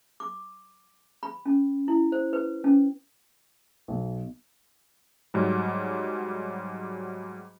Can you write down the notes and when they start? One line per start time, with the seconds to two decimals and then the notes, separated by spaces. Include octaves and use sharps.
0.20 D6
1.23 B5
1.46 C#4
1.88 E4
2.12 C5
2.33 B4
2.64 C#4
3.88 B1
5.34 G#2 F#3 G3